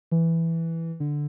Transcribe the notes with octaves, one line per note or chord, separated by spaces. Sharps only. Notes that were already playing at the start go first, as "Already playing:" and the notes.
E3
D3